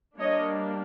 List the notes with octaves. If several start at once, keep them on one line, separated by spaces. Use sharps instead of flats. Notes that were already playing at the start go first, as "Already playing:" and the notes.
G3 A#3 D4 C#5 D#5